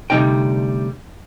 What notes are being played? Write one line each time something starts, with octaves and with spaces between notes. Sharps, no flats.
D2 C3 F#3 G3 D#4 G5